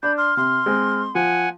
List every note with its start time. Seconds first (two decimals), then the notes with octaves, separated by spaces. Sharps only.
0.03 D4 B5 G6
0.17 C6 F6
0.37 C3 C6
0.66 G#3 C4
1.15 F3 F#5 G#5